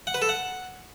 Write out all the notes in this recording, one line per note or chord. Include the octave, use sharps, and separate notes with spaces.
F#5
B4
A4
F#5